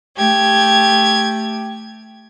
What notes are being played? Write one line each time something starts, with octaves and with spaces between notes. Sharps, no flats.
A3 G4 G#6